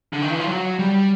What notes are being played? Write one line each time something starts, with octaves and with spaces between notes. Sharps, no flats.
D3
D#3
E3
F3
F#3
G3